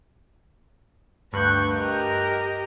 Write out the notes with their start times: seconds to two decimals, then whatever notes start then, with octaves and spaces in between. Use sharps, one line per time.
1.33 D2 G2 B4 C#6 F#6 G6
1.76 G4 A#4 D#5